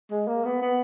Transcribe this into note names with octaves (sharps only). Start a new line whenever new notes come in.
G#3
A#3
B3
B3